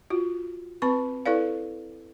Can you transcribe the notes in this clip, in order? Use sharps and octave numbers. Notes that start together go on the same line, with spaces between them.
F4 F#4
C4 B4 B5 C#6
E4 A4 B4 D5 F5